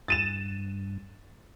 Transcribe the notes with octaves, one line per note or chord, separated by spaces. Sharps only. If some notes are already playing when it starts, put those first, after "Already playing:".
G2 A6 D#7 E7